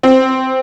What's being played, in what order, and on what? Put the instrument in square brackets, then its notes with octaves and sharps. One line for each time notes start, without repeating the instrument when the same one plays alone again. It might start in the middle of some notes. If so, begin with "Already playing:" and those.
[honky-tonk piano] C4